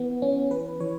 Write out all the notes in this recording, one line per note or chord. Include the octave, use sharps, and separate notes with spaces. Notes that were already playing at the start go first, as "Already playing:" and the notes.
Already playing: E3 B3
E3 C#4
E3 B4
E3 C#5